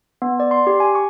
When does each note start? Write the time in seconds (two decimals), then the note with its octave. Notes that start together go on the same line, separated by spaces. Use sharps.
0.22 B3
0.40 D5
0.51 C6
0.67 G4
0.80 G#5
0.95 C#6